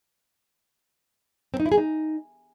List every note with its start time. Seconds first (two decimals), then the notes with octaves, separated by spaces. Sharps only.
1.54 C4
1.60 D#4
1.66 E4
1.72 G#4
1.78 D#4